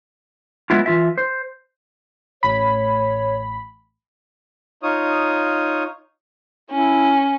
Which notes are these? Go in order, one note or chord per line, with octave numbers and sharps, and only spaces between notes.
F#3 G#3 B3 E4 F4
E3 F4 E5
C5
A1 C#5 B5
D#4 F4 C#5 D#6
C#4 E4